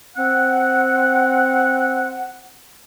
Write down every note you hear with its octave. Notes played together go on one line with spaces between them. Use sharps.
C4 F#5